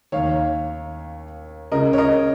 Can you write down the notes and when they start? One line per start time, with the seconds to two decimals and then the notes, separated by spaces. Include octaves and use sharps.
0.12 D#2 D#3 C#5 F5
1.72 C#2 C#3 A#4 D#5
1.93 C#5
1.98 A#4 D#5